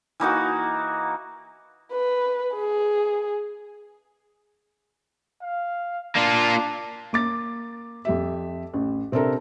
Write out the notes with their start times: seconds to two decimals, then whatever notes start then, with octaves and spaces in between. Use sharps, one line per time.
0.20 E3 A#3 D#4 F#4
1.93 B4
2.55 G#4
5.42 F5
6.16 A#3 D4 F4
7.13 A#3 D6 A6
8.05 F2 G4 E5
8.74 A1
9.12 C3 C4 D4 A4 A#4